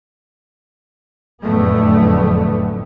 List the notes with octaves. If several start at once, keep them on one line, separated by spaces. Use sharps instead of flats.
F#1 F2 A2 D3 A3 B3